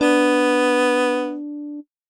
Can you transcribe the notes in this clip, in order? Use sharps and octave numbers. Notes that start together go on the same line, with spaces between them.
B3 D4